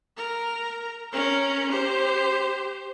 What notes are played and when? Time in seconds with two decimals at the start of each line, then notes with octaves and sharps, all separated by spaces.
0.17 A#4
1.12 C#4 A#4
1.71 G4 C5